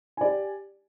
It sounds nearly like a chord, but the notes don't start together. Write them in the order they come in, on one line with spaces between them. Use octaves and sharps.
G#5 D5 G4